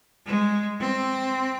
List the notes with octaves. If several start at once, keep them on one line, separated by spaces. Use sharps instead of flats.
G#3
C4